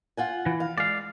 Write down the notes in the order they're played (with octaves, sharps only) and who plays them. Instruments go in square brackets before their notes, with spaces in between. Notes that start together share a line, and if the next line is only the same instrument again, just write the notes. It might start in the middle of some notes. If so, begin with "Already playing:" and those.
[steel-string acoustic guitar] F4 F#5 G#5
[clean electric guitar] E3
[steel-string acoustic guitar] F5
[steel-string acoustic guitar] G#3 [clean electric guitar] D5 F5